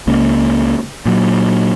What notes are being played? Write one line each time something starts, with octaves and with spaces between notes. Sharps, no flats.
C#2 C#3 A#3
A#2 F#3